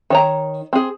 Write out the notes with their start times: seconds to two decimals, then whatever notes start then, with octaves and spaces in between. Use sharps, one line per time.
0.10 D#3 C#5 A#5
0.73 C4 G#4